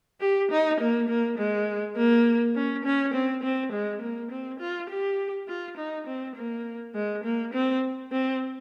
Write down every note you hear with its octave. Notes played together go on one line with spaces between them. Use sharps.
G4
D#4
A#3
A#3
G#3
A#3
C#4
C#4
C4
C4
G#3
A#3
C4
F4
G4
F4
D#4
C4
A#3
G#3
A#3
C4
C4